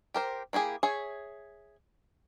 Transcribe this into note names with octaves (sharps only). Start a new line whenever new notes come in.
G4 A#4 C5
A#3 E4 G4 G#4
G#4 C#5 E5